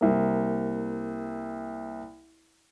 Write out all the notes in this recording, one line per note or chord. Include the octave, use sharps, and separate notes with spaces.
C2 A#3